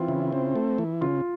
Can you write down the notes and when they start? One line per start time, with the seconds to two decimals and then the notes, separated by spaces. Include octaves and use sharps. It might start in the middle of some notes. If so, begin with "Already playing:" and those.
Already playing: E3 C4 F4
0.08 C#3 E4
0.32 C4
0.56 A3
0.78 E3
1.01 C#3 F4